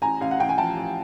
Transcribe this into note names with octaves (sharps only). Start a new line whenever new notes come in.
A1 G#5 A#5
A1 F5
F#5
A1 G5
G#5
F3 G5 A5
A1